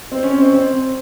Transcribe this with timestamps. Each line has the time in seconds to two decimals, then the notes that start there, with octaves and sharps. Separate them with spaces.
0.11 C4
0.23 C#4
0.38 C4
0.52 C4